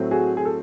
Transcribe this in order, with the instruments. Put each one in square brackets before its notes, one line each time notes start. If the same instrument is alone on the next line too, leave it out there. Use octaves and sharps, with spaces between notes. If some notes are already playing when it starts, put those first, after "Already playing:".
Already playing: [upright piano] A2 F#3 A3 C4
F#4 G#4
G#4
A4